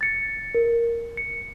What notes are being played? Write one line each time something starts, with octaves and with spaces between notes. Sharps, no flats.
A6 C#7
A#4
C#7